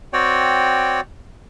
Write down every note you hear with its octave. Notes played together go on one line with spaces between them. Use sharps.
C4 F#4 C#5 D5 G5